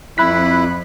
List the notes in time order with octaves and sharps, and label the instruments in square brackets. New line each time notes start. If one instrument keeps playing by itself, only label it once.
[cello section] F2 [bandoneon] E4 [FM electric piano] B5 F#6 B6